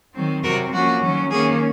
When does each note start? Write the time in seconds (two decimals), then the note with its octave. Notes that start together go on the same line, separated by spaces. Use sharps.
0.14 D#3 F#3 C4
0.43 C3 F#3 C4 F#4 A#4
0.73 F3 A#3 C#4 F#4
1.02 D#3 F#3 C#4
1.31 D#3 A#3 C#4 G#4